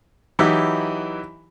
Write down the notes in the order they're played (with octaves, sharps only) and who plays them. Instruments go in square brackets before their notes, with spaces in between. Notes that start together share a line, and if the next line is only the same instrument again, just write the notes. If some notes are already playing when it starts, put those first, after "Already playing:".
[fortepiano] E3 F#3 D#4 E4 G4